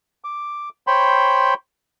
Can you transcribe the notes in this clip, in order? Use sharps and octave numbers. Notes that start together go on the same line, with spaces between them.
D6
C5 C#5 G5 B5 C6